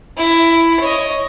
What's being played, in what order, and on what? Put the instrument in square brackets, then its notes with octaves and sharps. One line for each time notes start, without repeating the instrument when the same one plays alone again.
[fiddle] E4
C#5 D#5